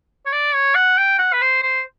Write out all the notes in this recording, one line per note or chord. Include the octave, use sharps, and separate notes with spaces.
C#5
D5
C#5
F#5
G5
F#5
B4
C5
C5